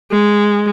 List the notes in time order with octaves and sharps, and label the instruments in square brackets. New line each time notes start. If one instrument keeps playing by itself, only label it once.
[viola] G#3